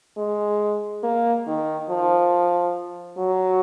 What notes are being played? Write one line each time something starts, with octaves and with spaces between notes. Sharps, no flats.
G#3
A#3
D#3
F3
F#3